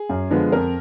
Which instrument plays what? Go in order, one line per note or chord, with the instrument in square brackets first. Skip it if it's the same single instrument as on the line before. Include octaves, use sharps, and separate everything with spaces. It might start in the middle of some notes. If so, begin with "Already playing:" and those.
Already playing: [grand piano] G#4
F#2
D3 F3 G#3 B3
F2 A#4